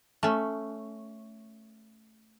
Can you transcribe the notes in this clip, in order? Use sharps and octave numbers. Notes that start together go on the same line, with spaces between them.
A3 C#4